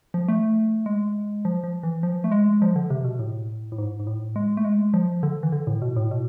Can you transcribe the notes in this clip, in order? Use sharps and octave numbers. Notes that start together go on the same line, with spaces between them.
F3
A3
G#3
F3
F3
E3
F3
A3
G#3
F3
D3
C3
B2
A2
A2
G#2
G#2
A2
G#3
A3
G#3
F3
D3
E3
D3
A2
B2
A2
B2